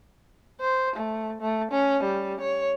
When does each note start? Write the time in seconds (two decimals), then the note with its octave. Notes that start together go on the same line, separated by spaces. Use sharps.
0.61 C5
0.96 A3
1.41 A3
1.72 C#4
2.03 G3
2.41 C#5